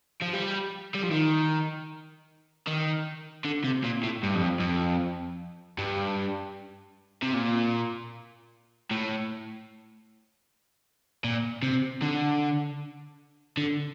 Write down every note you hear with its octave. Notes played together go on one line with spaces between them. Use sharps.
F3
G3
G3
F3
D#3
D#3
D3
C3
A#2
A2
G2
F2
F2
G2
C3
A#2
A2
A#2
C3
D3
D3